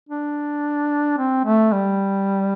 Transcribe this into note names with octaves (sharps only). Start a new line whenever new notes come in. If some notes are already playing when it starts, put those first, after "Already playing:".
D4
C4
A3
G3